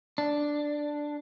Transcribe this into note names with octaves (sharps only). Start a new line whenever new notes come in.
D4